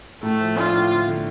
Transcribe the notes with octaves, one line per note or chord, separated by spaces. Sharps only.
A2 A3
F3
D4 F4
A2
D3
D3